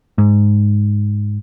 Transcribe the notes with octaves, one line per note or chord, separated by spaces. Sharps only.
G#2